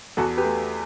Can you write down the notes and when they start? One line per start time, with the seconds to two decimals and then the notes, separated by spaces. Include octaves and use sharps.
0.17 E2 F#4 A4
0.37 G4 B4
0.44 A3